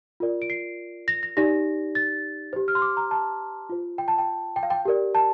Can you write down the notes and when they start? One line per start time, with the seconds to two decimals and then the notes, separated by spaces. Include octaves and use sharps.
0.20 F4 A#4 D5
0.42 D7
0.50 C7
1.08 A#6
1.23 A#6
1.37 D#4 G4 D5 A#6
1.95 A6
2.53 G4 C5
2.68 F6
2.75 C6
2.82 D6
2.97 A#5
3.11 A5
3.70 F4 C5
3.98 G5
4.08 A5
4.18 G5
4.56 G5
4.63 F5
4.70 G5
4.85 G4 A#4 D5
5.15 A5